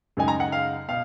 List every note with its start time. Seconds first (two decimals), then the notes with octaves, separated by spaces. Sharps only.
0.17 F#2 C#3 G#3 D#4 G#5
0.28 A#5
0.40 F#5
0.52 F5
0.89 B2 F5